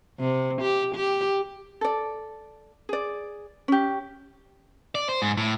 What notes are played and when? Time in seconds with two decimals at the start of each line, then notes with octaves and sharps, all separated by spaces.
0.19 C3
0.62 G4
0.95 G4
1.81 A4 D5
2.89 G#4 D5
3.68 C#4 G4
4.95 D5
5.09 C5
5.22 G#2
5.37 A2